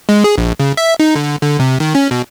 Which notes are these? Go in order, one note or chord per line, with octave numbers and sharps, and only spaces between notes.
G#3
G#4
A#1
C#3
E5
D#4
D3
D3
C3
D#3
C#4
B2